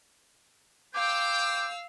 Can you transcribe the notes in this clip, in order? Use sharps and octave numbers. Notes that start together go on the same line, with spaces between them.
C5 F5 G5 D6 E6